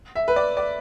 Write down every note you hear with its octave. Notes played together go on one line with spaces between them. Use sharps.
E5
B4
D5
D5